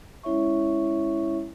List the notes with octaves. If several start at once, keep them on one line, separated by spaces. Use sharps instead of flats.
G#3 C#4 E4 C#5 E5 C#6